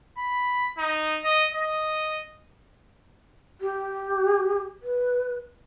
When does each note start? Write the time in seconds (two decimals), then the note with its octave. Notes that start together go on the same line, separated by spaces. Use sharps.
0.18 B5
0.78 D#4
1.25 D#5
1.54 D#5
3.61 G4
4.82 B4